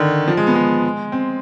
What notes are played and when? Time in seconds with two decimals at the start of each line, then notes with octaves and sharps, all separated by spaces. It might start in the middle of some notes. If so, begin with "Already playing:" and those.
Already playing: D3 D#3
0.28 F3
0.37 G#3
0.47 B3
0.55 G#3
1.12 C4